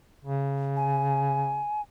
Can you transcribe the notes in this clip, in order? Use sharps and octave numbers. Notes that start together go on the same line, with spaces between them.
C#3
G#5